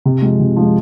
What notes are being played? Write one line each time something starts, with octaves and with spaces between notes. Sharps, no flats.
C3
F3 G#3
C3
F3 G#3